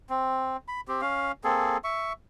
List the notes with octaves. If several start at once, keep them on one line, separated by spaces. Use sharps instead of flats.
C4
B5
C4 G4
C#4 F5
A#3 C4 G#4 A4
E5 C#6